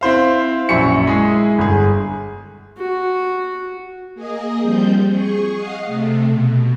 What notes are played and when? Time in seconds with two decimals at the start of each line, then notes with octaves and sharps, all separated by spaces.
0.01 C4 E4 C5 F5
0.69 A#1 F#2 E5 G#5 C#6 C#7
1.07 G#3 E4 G#4
1.58 G1 G#4
2.78 F#4
4.14 A#3 G#4 D#5
4.62 F3 G3 C4 G6
5.08 G#4 C#6
5.55 D#5 F5 F#5 D#6 C7
5.85 C3 A3
6.28 B2